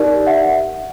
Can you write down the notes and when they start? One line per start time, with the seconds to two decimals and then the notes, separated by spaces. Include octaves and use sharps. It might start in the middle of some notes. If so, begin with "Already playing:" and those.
Already playing: D#4 G4 A#4 D5
0.26 E5 F#5